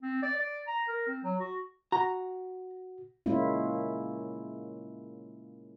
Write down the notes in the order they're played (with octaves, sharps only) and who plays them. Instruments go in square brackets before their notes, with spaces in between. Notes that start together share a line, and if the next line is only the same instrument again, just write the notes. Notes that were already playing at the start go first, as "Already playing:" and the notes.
[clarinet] C4
D5
D5
A#5
A#4
C4
F#3
F#4
[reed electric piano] F#4 [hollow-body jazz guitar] A#5
[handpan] G#3 A#3 C#4 E4 F4